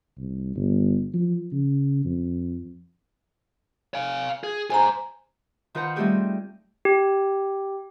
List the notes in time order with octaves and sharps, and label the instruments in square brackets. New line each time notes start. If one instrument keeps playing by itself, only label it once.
[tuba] C2
G1
F3
C#3
F2
[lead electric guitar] F5 G#5
G#4
[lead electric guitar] G#4 C5 [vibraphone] G#5 A#5
[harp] D#3 F4 B4 C5 F#5 A#5
G3 A3 C4 D#4 G4 G#4
[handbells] G4